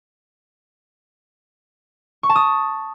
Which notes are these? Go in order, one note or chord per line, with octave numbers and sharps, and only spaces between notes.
C#6
A5
D#6